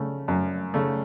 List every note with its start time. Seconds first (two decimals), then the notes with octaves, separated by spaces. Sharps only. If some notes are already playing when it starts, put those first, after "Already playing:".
Already playing: C#3 A3
0.28 F#2
0.74 C#3 A3